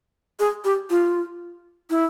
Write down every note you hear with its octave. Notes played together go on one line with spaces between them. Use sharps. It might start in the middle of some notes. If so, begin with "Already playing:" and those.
G#4
G4
F4
E4